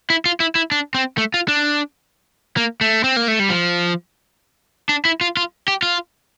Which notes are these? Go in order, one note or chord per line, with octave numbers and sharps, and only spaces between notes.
E4
F4
E4
E4
D4
C4
A3
F4
D4
A#3
A3
C4
A#3
A3
G3
F3
D4
E4
F4
F4
G4
F4